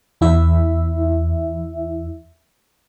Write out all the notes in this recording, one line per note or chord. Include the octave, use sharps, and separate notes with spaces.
E2 E4 E5